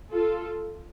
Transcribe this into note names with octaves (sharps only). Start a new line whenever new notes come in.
F4 A4